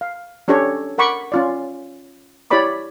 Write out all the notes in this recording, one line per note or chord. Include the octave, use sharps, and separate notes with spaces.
F5
C#4 D4 G4 A4 C#5
A#4 F#5 B5 C#6 D6
C#4 F4 D5
E4 G4 C#5 D5 B5 D6